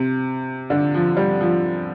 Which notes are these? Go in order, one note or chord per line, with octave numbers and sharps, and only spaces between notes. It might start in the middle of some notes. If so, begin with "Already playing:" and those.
Already playing: C3
D3
F3
G3
F3